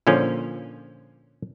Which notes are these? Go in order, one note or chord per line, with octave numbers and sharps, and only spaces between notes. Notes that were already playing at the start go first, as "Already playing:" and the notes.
A#2 D3 F3 C#4